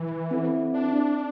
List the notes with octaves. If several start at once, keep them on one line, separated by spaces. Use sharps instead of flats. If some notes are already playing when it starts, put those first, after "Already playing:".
Already playing: E3
C4 E4 A4 E5
D4